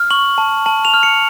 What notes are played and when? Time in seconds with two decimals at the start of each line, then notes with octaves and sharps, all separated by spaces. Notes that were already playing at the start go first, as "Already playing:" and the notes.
Already playing: F6
0.11 C#6 F#7
0.38 A5
0.66 A5 F#7
0.85 F7
0.94 F6
1.03 C#7